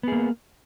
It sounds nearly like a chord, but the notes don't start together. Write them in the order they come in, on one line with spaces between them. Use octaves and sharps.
B3 G#4 A#3